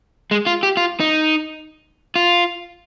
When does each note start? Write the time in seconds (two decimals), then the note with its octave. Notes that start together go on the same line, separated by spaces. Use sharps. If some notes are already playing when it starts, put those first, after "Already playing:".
0.31 G#3
0.46 F4
0.63 G4
0.77 F4
1.00 D#4
2.16 F4